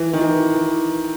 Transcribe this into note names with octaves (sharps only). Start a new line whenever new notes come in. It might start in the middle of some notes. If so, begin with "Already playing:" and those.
Already playing: E3
D#3
E3
E3